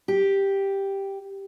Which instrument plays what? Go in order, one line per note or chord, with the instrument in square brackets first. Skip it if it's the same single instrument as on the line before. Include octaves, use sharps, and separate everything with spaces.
[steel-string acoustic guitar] G4